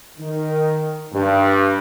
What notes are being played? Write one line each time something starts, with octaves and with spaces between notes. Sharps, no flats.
D#3
G2